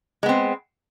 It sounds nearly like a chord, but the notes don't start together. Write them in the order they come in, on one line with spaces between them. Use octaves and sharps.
G#3 B3 C4